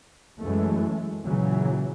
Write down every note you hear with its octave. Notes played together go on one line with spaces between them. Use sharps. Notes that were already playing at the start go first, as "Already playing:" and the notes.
F#2 E3 G#3 A3
A#2 C#3 E3 F#3